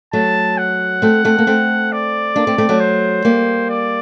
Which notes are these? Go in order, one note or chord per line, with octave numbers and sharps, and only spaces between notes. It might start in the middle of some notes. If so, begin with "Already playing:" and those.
F#3 A3 A5
F#5
A3 C4
A3 C4
A#3
A3 C4
D5
A#3 D4
A3 C4
A3 C4
F#3 A3
C5
G3 A#3
D5